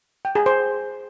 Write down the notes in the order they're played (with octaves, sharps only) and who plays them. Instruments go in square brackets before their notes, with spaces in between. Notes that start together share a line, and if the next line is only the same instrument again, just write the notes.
[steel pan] G5
G#4
C5